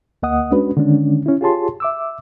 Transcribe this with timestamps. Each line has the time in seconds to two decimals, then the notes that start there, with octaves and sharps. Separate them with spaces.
0.23 D2 A#3 D#5 F#5 D#6
0.51 G#3 C#4 D4 F#4 B4
0.77 D3 D#3 G#3 C#4 D4
1.26 C#4 E4
1.41 F4 G4 G#4 C#5 A5 C6
1.80 E5 D6 E6